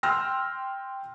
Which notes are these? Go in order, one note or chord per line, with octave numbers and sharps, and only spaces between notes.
G5 C6 E6 F6 A#6